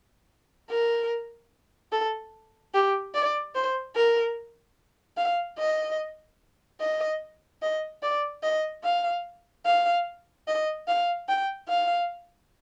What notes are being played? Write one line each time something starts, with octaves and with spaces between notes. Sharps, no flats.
A#4
A4
G4
D5
C5
A#4
F5
D#5
D#5
D#5
D5
D#5
F5
F5
D#5
F5
G5
F5